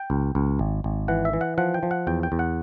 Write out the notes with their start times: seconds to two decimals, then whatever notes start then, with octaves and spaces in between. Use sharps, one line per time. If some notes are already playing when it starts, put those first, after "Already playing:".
Already playing: G5
0.10 C#2
0.35 C#2
0.59 G#1
0.84 G#1
1.08 E3 F#5
1.25 E5
1.33 E3
1.41 F#5
1.58 F3 F#5
1.74 G5
1.83 F3
1.91 F#5
2.07 E2 G5
2.23 G5
2.32 E2
2.39 F#5